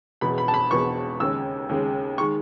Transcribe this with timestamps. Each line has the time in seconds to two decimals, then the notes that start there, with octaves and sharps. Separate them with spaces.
0.21 E1 E2 B2 B5
0.38 B5
0.48 A5
0.54 B5
0.70 E1 E2 B2 C#6
1.20 D#2 C#3 G#3 E6
1.69 D#2 C#3 G#3
2.18 D#3 G#3 C#6